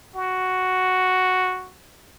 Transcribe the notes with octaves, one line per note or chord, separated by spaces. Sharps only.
F#4